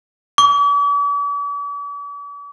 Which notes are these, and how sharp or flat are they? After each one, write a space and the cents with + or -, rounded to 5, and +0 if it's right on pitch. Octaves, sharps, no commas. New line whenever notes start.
D6 -45